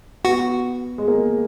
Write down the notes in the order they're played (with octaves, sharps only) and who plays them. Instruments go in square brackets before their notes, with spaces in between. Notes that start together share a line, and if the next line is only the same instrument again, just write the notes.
[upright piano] B3 [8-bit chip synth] F#4
[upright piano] G#3
A#3